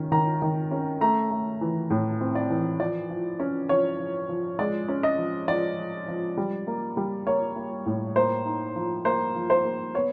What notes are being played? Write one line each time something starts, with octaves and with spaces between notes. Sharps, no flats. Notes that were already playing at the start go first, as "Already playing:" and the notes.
Already playing: D#3 C#4
D#3 A#5
D#3
C#4
A3 A#5
A3
E3
A2
C4
D5
E3
F3 D5
F3
C#4
F3 C#5
F3
F3
G#3 D5
C#4
D#5
F3
F3 D5
F3
F3
G3
A#3
G3
A#3 C#5
A#3
A2
A#3 C5
D#4
F3
A#3 C5
F3
C5
A#3
B3 C#5